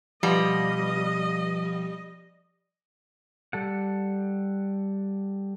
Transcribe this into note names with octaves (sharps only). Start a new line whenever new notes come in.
B2 F3 G3 D#5
G3 A4 F#5